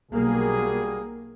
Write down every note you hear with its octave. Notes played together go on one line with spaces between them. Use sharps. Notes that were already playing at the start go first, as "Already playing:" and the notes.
B1 G3 A#3 F#4 G#4